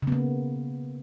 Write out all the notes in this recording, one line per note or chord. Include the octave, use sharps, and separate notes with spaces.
C#3 A#3 B3